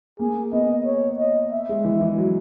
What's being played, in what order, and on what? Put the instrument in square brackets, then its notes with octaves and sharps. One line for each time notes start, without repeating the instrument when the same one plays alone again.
[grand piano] A#3 [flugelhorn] G#4
[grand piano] B3 [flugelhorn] D#5
[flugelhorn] C#5
D#5
E5
[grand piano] G#3
E3
E3
F#3